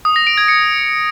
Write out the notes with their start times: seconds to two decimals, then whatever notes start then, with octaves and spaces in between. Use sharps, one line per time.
0.05 D#6
0.16 A#6
0.27 D7
0.38 G#6
0.48 C#7